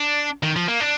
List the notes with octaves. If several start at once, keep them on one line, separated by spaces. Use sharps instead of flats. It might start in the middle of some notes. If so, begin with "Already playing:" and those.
Already playing: D4
D#3
F3
A#3
D4